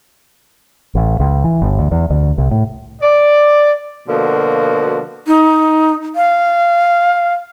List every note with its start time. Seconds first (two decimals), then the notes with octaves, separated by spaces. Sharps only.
0.95 A1
1.20 C#2
1.44 E3
1.62 G1
1.79 D2
1.92 E2
2.10 D2
2.38 C2
2.51 A2
3.02 D5
4.08 B2 D3 F3 A#3 F#4
5.27 D#4
6.16 F5